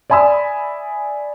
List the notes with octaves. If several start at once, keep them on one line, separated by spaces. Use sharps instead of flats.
D5 E5 G#5 B5 D#6 E6